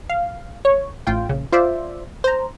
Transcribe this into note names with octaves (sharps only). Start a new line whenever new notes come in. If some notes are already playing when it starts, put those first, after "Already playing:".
F5
C#5
A1 A2 F4 G5
A#1 C#3
F4 C5 D5 E5
C5 A#5